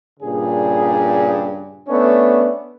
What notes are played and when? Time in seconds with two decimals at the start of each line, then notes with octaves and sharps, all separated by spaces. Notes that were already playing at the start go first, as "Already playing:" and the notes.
0.20 G2 A#2 C#3 G#4
1.88 A3 B3 C#4 D4